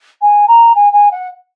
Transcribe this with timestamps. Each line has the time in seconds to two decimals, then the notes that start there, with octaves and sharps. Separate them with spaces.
0.22 G#5
0.48 A#5
0.75 G#5
0.93 G#5
1.11 F#5